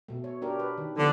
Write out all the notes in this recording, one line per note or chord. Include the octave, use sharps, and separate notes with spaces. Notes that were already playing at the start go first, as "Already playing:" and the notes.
B2 A3
C#5
D4 G4 A#4
B4
D#3
D3 F3 B3